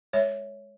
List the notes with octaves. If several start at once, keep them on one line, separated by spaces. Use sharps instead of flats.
G#3 C#5 E5